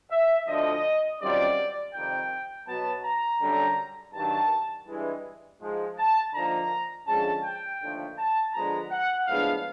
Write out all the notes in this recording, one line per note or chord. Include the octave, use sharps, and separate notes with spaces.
E5
D2 D3 F3 D#5
F#2 D#3 G3 C4 F4 D5
F2 C3 D#3 G3 G5
B2 F#3 B3 A5
A#5
F#2 D3 G3
G2 D#3 F#3 A5
G2 E3 G#3
G#2 F3 G#3
A5
D3 F3 A#3 D#4 A#5
D3 F3 G#3 C#4 A5
G5
D#2 D3 F3 A3
A5
D3 F3 G#3 B3 A#5
F#5
A2 F3 G#3 B3 D4 F5